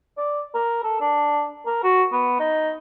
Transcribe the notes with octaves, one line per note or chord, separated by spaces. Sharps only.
D5
A#4
A4
D4
A#4
F#4
B3
D#4